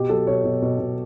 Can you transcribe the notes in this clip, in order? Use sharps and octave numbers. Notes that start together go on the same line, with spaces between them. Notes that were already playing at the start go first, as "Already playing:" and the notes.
Already playing: B2 G4
F#3 A4
B2 C#5
B2
B2
B2